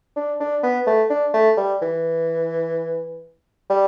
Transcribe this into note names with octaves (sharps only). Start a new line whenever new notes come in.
D4
D4
B3
A3
D4
A3
G3
E3
G3